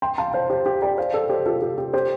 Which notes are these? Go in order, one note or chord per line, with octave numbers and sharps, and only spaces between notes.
G5 C6
F5 A5
C5 F5
G4 C5
G4
D5 G5
C5 F5
A4 D5
G4 C5
F4 A4
G4
G4
G4 C5